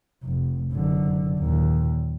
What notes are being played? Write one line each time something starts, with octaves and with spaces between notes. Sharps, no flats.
F1
F#1 D3
D#2 A#2